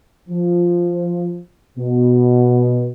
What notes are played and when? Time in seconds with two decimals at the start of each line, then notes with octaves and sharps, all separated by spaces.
0.29 F3
1.78 B2